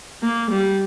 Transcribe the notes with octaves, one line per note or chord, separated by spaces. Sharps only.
A#3
G3